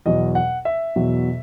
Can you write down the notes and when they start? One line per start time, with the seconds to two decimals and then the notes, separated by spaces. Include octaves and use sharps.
0.06 E2 B2 F#3 D#5
0.35 F#5
0.65 E5
0.96 E2 B2 F#3